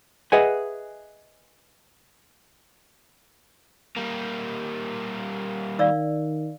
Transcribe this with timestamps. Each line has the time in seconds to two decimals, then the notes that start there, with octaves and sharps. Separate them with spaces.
0.32 G#4 B4 D#5 E5 F#5 G#5
3.96 G3 A#3
5.79 D#3 D5 F5 E6